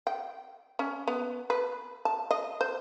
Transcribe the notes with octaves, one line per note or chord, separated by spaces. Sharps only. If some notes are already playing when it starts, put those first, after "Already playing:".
G5
C#4
B3
B4
A5
D#5
C5